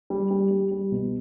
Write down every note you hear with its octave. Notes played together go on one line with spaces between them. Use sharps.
G3
G3
G3
G3
B2